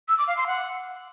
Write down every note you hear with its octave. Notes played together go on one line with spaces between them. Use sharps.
E6
D6
F5
C6
F#5